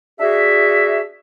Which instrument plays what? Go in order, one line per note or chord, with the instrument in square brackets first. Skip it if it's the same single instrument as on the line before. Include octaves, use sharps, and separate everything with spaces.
[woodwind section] D4 F#4 G#4 E5